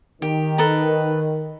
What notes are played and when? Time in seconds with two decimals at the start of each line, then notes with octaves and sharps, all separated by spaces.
0.22 D#3 G4
0.58 A4 B4 A#5